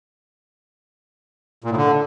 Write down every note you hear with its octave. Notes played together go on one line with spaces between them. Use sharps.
A#2
A2
D3